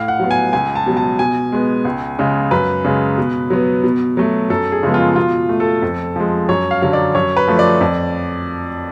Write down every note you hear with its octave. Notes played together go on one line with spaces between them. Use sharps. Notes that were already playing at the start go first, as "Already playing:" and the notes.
Already playing: A2 F5
F#5
F#3 B3
G#5
C#2 G#5
A5
B2 F#3
A5
B2 G#5
G#3 B3
C#2
C#3 G#3
F#2 B4
C#3 G#3
B2
F#3 B3
B2
F#3 A3
F#2 A4
G#4
C#3 F3 G#3 B3
F4
B2 F4
A3
A4
F2
F3 G#3
F#2 C#5
F5
D3 F#3 F5
D5
F#2 C#5
B4
F3 A3
D5
F2